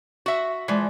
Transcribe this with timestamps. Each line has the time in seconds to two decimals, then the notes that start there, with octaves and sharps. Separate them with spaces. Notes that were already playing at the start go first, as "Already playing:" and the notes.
0.26 F#4 E5
0.68 E3 F3 G#3 D5